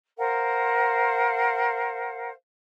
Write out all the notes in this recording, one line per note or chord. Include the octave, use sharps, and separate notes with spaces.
A#4 C5 F5 F#5